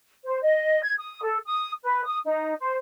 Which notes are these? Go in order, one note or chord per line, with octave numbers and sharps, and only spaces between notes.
C5
D#5
G#6
D#6
A4
D#6
B4
D#6
D#4
C5